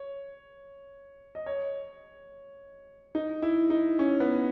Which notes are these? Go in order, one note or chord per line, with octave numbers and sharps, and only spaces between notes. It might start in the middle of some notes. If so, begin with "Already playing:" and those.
Already playing: C#5
D#5
C#5
D#4
E4
D#4
C#4
B3